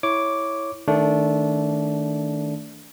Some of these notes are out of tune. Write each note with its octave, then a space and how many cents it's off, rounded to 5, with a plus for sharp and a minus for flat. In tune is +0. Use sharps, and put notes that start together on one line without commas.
E4 +0 C#5 +0 D6 -5
D#3 +5 A3 +0 D4 -20